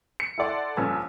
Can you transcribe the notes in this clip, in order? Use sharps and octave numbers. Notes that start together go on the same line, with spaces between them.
C#7
E4 A4 D5 F#5 C6
A#1 G2 C#4 A4 B4 G#5